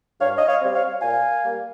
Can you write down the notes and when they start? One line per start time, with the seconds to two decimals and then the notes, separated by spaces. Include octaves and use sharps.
0.20 G2 C#5 F5
0.38 D#5
0.47 C#5 F5
0.61 G3 C4
0.74 C#5 F5
1.01 A#2 F5 G#5
1.43 G3 A#3